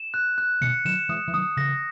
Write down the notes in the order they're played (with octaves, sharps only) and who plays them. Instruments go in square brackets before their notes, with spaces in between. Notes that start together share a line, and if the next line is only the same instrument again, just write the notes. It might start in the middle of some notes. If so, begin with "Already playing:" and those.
Already playing: [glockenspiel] E7
F#6
F#6
[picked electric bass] B2 D#3 [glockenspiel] C#7
[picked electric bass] D#3 F#3 [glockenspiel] E7
[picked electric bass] E3 G#3 [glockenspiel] D#6
[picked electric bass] E3
[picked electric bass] D#3 F#3 [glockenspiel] D#6
[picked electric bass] C#3 E3 [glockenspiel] A#6